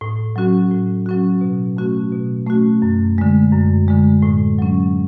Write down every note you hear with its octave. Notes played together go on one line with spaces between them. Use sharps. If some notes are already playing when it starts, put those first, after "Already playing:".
A2
F#3 C#4 F#4
A2
F#3 C#4 F#4
B2
A3 C#4 F#4
B2
A3 C#4 F#4
F#2
D3 G#3
F#2
D3 G#3
A2
F#3 C#4